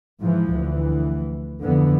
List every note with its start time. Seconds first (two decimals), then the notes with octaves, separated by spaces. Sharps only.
0.21 G#2 E3 F3
0.53 D2 E3
1.63 F2 D3 E3 B3